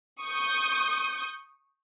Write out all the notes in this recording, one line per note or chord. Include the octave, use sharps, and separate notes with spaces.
C#6 D#6 G6